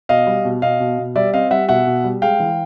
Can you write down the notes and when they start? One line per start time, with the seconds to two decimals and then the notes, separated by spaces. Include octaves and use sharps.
0.09 B2 D#5 F5
0.27 G3
0.45 B2
0.62 B2 D#5 F5
0.80 B2
0.98 B2
1.16 G3 D5 E5
1.33 C4 D#5 F5
1.51 G3 E5 F#5
1.68 B2 E5 F#5
1.87 B2
2.04 G3
2.22 G#3 F5 G5
2.40 E3